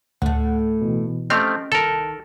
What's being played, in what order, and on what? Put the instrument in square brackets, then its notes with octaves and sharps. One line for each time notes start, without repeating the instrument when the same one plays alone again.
[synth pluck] D2 [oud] A2 A3 [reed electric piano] F#5
[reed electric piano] B2 E3
[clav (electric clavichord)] F3 A3 C4 [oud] C#4 G4 [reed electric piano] D#5 [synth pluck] F6
[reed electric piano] C2 A5 [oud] D#3 [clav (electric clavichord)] A4 A#4